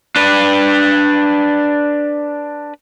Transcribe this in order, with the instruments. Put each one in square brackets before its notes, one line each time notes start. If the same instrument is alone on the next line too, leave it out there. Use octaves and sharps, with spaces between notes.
[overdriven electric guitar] D4 B4